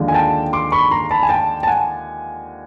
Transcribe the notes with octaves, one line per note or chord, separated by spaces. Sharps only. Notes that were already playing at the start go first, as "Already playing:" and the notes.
Already playing: D#2 D3 F3 G#3
G#5
G5 A5
C6 D6
B5 C#6
A#5 C6
A5 B5
G#5
G5 A5
A5
F#5 G#5